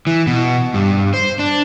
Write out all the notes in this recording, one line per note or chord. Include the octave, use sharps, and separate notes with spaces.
E3
B2
G2
C5
D4